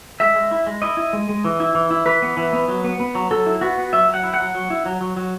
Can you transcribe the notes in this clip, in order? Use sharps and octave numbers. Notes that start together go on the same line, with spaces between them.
G#3 E5
G#3
E4
G#3
E4 D#5
E4
G#3
G#3
E3
E4
E3
E4
E3 B4
B3
E3
B3
F#3
B3
B3
F#3
F#3 A4
E4
B3 F#4
B3
F#3 E5
F#3
F#5
E4
F#5
F#3
F#3
E4
F#3
F#3
F#3